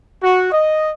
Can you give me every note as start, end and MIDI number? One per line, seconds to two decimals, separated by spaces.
0.23 0.50 66
0.52 0.89 75